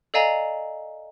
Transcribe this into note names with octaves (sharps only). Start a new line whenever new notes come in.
A4 D5 D#5 F5 G#5 A#5